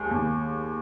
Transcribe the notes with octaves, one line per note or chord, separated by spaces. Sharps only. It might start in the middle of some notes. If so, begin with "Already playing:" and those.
Already playing: D#2 G#3
D#2